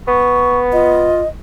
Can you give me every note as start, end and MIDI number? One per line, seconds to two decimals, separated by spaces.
0.08 1.18 59
0.08 0.59 85
0.72 1.22 65
0.72 1.28 75